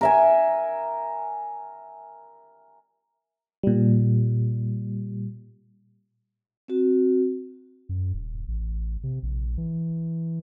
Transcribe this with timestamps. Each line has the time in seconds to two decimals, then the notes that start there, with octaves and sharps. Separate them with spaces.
0.01 A#4 E5 G#5
3.63 A#2 G3
6.68 C4 F#4
7.89 F#2
8.14 D#1
8.48 A1
9.03 C3
9.23 A#1
9.58 E3